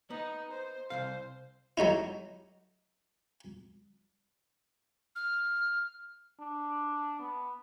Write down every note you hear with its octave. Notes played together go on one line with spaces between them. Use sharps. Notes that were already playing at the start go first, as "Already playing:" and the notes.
B3 D#4
C5
C2 F2 C5 F5
F#3 A3 D#4 E4
F6
D4
B3